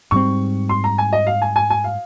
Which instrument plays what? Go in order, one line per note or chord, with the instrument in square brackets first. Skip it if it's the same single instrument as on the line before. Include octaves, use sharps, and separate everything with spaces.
[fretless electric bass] G#2 G3 C4 [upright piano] C#6
[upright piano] C6
A#5
G#5
D#5
F5
G#5
G#5
G#5
F5